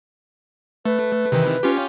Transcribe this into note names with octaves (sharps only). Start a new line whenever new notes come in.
A3 B4
C3 D#3 E3
C#4 F4 G4